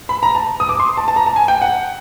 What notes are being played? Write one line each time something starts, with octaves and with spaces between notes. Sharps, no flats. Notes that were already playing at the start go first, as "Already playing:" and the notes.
B5
A#5
A5
D#6
D6
C6
A5
A5
A#5
A5
G#5
G5
F#5